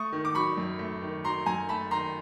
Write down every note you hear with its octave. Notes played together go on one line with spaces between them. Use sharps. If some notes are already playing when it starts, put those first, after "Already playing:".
Already playing: A3 C#6 D#6
D#3
D6
F#3 B5 C#6
F#2
A3
D#3
F#3 A#5 C6
F#2 G#5 A#5
A3 A5 B5
D#3 A#5 C6